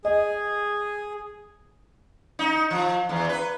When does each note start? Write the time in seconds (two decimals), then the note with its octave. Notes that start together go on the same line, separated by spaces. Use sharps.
0.05 G#4 D#5
2.39 D#4
2.71 F3
3.09 E2
3.29 B4